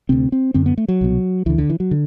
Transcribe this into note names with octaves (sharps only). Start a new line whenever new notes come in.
D2 C3 C4
C4
F#2 D3 C4
B3
A3
F#3
C2 B2
D2 D3 E3
D3
E3
F#3
D3